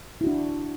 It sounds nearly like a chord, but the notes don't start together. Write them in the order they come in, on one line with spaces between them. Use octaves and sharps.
E4 F#4 D4